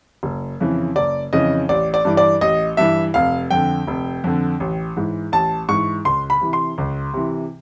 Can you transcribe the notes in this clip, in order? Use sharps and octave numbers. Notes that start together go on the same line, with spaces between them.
F#1
F2 C#3 E3
F#1 D5
F2 C#3 E3 D#5
A1 D5
D5
G2 E3
D5
A1 D#5
G2 E3 E5
F1 F5
F2 D3 G5
F1
F2 D3
A1
G#2 E3
A1 A5
G#2 E3 C#6
C#2 C6
B5
C3 E3
C6
C#2
C3 E3